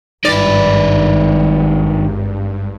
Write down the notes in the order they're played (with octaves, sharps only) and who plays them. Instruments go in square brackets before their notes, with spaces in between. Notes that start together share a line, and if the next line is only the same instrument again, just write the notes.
[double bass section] G#1 [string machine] G2 [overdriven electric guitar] D#3 B4 [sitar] D5